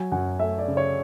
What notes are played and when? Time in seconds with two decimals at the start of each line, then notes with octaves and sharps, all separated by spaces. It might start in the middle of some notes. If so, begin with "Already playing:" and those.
Already playing: F#3 G#5
0.12 F#2 F#5
0.40 A3 E5
0.59 D5
0.68 C#3
0.77 C#5